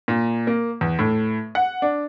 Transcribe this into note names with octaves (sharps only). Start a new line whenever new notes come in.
A#2
A#3
E2
A2
F#5
D4